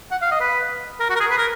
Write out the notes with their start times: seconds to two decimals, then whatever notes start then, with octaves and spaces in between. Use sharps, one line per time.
0.11 F#5
0.22 F5
0.31 D#5
0.40 B4
1.00 A#4
1.10 F#4
1.15 A#4
1.20 G#4
1.30 B4
1.38 A#4